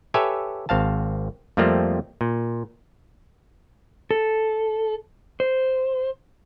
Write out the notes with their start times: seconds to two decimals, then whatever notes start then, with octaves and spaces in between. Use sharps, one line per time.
0.14 G4 A4 B4 C#5 E5 G#5
0.69 G#1 C4 F5 A5
1.57 F2 F3 G3 A3 A#3 C4
2.21 A#2
4.11 A4
5.40 C5